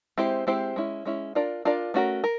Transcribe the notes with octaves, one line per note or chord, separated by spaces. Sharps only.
G#3 C4 E4 G4 C5
G#3 C4 E4 G4 C5
G#3 C#4 E4
G#3 C#4 E4
D4 F4 A#4 D5
D4 F4 A#4 D5
A3 C#4 F#4 A#4
A#4